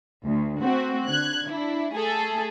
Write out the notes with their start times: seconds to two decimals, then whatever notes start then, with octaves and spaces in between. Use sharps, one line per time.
0.25 D2
0.60 A3 C4 F#4
1.07 D3 F#6 G#6
1.48 D4 E4
1.95 A3 G#4 A4